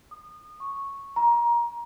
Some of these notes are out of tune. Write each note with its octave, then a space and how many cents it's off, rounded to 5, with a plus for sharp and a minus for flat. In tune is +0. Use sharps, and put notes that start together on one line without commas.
D#6 -30
C#6 -5
A#5 +20